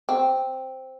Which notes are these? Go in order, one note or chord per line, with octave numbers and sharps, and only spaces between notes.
C4